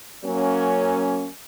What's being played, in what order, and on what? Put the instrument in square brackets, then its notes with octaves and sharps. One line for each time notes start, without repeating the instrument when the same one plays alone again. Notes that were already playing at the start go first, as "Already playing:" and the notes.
[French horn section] F#3 A#3 C#4